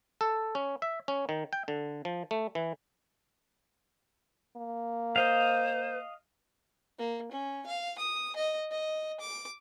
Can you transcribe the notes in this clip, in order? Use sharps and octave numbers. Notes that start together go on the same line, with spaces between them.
A4
C#4
E5
C#4
D#3
G5
D3
F3
A3
E3
A#3
C5 D#5 F5
A#3
C#4
F5
D#6
D#5
D#5
D6